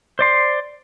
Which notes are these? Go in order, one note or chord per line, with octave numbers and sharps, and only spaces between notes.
C5 D5 C6